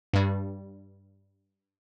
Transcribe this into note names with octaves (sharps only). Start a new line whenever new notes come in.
G2 G3